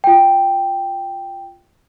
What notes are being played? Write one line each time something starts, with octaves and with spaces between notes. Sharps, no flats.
F4 G5